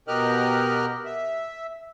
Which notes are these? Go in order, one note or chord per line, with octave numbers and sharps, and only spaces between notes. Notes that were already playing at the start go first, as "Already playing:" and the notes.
B2 G4 A#4 D#5 F6 F#6
E5